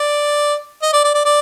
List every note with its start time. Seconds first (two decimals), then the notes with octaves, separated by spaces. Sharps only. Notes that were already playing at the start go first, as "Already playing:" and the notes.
Already playing: D5
0.82 D#5
0.93 D5
1.04 D5
1.14 D5
1.25 D5